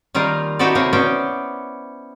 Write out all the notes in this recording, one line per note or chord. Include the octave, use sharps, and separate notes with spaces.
D#3 G3 A#3 F4 A#4
D#4 E4 F#4 G4 A4 D5
C3 A#3 C4 C#5 F#5
B3 C#4 C5 D5 G5